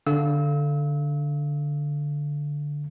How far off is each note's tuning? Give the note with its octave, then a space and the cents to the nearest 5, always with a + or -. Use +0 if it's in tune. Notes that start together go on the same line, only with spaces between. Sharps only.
D3 +0 F5 -15 E6 -35